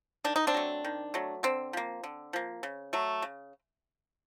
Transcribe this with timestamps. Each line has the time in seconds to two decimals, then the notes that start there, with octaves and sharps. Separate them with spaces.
0.24 D#3 D4
0.36 D#4
0.47 C4 D4
0.54 F#3 A3
0.85 D#3
1.14 F#3 A3
1.43 D3 C4
1.73 F3 A#3
2.04 D3
2.33 F3 A#3
2.63 C#3
2.93 F#3 A3
3.22 C#3